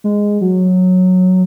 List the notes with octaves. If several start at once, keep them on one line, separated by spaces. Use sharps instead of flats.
G#3
F#3